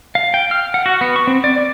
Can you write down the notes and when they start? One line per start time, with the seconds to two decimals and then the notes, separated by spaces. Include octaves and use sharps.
0.15 F5
0.34 G5
0.51 F6
0.74 F#5
0.86 F#4
1.01 B3
1.16 C#6
1.27 C4
1.44 D5
1.58 D5